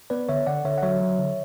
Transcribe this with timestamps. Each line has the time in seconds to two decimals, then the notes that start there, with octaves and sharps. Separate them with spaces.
0.10 B3 B4 D5
0.29 D3 C#5 E5
0.47 D3 D5 F#5
0.65 D3 C#5 E5
0.78 F#5
0.82 F#3 C#5 E5
1.00 F#3
1.19 D3